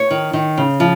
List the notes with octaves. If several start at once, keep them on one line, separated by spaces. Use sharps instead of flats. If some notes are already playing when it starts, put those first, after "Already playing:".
Already playing: C#5
D#3
D#3
C#3
F3